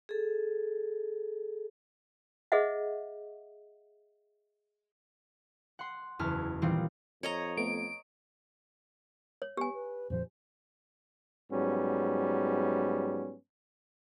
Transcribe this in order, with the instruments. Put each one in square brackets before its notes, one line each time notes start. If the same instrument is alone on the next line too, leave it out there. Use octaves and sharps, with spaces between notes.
[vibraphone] G#4 A4
[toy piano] G#4 C5 D#5 E5 F#5
[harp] F#5 C6
F#1 E2 C#4 E4 A5 F6
A#2 D#3 E3 G3 C4 F4
[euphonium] F2 [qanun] C#5 D#5 A#5
[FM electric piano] A3 B3 [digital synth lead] D7
[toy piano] C#5
[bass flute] B3 [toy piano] G4 G#5
[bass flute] B4
[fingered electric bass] F2 A#2 F3 [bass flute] C5
[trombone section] G#2 F#3 G3 B3 C#4